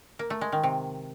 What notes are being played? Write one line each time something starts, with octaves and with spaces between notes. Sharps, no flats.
A#3
A3
G#3
D#3
C3